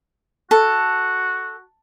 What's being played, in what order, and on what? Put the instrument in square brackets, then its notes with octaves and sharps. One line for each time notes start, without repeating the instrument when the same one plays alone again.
[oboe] F#4 [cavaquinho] A4